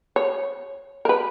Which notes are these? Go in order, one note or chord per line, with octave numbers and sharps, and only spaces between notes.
C#5
A#4
B4